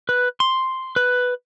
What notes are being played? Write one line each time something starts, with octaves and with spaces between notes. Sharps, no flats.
B4
C6
B4